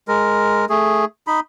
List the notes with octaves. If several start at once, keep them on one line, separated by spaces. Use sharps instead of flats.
G#3 A#4
A3 G#4
D#4 B5